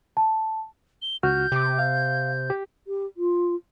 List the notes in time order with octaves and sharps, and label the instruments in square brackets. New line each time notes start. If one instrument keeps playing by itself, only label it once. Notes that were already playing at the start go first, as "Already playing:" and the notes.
[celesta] A5
[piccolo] G7
[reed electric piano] C#2 F#4 F6 [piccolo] G6
[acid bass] C3 [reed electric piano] G4 D6
[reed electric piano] F5
G4
[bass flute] G4
F4